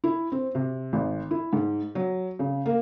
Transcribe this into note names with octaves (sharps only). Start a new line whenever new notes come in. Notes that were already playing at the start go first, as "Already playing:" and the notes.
E4
C4
C3
G#1
E4
G#2
F#3
C#3
A#3